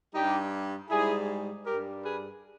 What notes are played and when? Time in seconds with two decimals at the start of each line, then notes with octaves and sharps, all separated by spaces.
0.14 G2 G3 D#4 G4
0.90 G#2 G3 E4 G#4
1.66 G2 G3 G4 A#4
2.04 G#4 B4